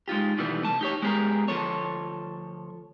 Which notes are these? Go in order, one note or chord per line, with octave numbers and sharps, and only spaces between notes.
G#3 D#4 F4 G4
B2 D#3 E3 G3 A3 B3
C2 A3 A5
D#4 G4 C#5
G#3 B3 G4 G#4 A#4
D2 F3 A4 C#5